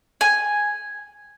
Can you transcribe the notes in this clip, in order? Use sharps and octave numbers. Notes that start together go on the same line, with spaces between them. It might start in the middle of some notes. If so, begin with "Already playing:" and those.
G#5